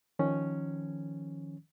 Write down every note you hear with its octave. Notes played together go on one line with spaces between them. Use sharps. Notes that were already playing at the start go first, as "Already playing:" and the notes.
D#3 F3 C#4